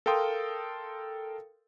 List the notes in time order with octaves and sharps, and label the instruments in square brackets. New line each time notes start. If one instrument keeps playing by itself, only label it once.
[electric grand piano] A4 A#4 F5 G5 C6 D#6